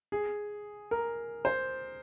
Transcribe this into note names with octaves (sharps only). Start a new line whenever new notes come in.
G#4
A#4
C5